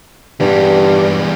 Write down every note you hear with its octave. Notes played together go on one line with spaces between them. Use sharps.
E2 G2 G3